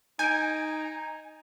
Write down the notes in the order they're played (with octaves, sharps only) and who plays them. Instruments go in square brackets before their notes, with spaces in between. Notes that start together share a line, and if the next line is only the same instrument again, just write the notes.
[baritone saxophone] D#4 [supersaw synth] G#5 [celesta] G6 D7